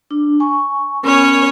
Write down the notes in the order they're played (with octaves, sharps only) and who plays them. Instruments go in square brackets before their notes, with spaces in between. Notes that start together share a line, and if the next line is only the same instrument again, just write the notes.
[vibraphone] D4
G#5 C#6
[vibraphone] B3 A#4 [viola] C#4 C#5